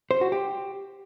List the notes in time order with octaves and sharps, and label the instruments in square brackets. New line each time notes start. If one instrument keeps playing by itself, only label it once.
[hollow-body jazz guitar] C5
F#4
G4